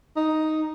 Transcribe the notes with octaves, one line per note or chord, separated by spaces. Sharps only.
D#4